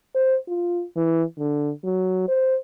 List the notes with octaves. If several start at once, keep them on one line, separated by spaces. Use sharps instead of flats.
C5
F4
E3
D3
F#3
C5